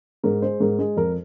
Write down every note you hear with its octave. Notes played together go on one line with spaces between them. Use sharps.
G#2 A#4
G#3 C5
G#2 A#4
G#3
F2 A#4